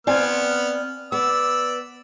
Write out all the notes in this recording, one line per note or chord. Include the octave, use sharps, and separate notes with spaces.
B3 C4 D5 G#5 F6
B3 D5 E6